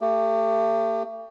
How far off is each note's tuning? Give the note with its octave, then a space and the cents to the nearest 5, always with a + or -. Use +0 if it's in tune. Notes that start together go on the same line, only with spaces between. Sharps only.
A3 +40 G4 +25